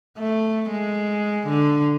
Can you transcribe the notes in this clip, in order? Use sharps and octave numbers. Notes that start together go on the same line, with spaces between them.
A3
G#3
D3